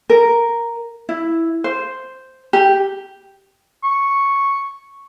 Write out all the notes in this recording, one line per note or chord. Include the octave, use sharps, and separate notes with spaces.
A#4
E4
C5
G4
C#6